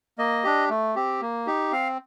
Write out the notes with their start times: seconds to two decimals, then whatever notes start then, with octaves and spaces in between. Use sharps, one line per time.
0.18 A#3 D#5
0.44 D4 G4
0.69 A3
0.96 C4 G4
1.21 A#3
1.47 D#4 G4
1.72 C4 F5